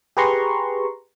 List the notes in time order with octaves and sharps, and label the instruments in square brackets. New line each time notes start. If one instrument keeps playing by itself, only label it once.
[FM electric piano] G4 G#4 B4 A#5 C6 C#6